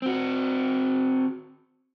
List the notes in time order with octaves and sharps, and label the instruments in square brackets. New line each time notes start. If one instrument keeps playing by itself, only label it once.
[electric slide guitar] C4 F#4